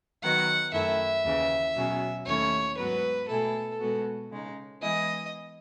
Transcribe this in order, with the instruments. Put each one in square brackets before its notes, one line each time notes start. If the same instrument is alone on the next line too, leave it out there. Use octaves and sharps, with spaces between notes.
[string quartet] D#3 F#3 B3 D#4 [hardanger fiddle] F#5
[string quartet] F#2 D#3 A3 E4 [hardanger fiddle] E5
[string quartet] D#2 C#3 E3
B2 F#3 C#4 G#4
[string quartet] D#2 D#3 A3 C#4 E4 [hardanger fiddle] C#5
[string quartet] G#2 F#3 B3 [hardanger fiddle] B4
[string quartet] B2 A3 E4 G#4 [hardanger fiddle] A4
[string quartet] B2 G#3 B3 F#4 A4
C#3 G#3 D#4
[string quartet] E3 G#3 B3 E4 G#4 [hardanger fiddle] D#5